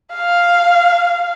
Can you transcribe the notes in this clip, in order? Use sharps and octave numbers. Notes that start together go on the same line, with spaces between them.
F5